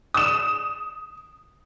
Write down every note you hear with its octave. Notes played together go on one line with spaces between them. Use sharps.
D#6 E7